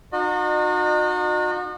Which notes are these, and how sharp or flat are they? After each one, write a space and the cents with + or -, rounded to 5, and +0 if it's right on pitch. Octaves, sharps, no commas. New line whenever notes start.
D#4 -35 F#4 -35 D#5 -40